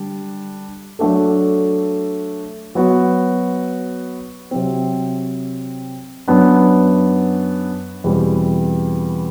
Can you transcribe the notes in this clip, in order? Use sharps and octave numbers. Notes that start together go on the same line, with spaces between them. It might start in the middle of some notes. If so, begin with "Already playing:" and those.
Already playing: D3 G3 D4
F#3 A3 D4 A4
F#3 B3 F#4
C3 F#3 C4
F#2 F#3 B3 D4
E2 B2 G3 C4